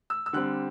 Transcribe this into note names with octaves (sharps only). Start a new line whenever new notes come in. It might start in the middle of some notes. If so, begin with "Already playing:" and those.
E6
E6
D3 G3 C4 F#6